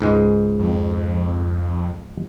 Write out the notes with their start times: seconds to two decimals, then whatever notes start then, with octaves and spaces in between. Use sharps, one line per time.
0.01 C#2 G#2 G#3
0.59 F2